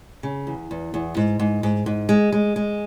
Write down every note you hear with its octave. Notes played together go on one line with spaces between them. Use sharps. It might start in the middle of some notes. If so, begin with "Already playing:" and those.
C#3
E2
E2
E2
G#2
G#2
G#2
G#2
G#3
G#3
G#3